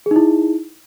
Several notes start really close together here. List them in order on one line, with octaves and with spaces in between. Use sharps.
G#4 D#4 E4